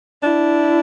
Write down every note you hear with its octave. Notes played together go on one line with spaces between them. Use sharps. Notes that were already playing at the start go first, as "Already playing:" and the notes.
D4 E4